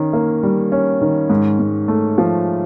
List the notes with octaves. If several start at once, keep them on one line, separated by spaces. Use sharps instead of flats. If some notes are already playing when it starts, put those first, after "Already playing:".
Already playing: D#3 C#4
A#3
G3
C#4
D#3
G#2
G#2
A3
F3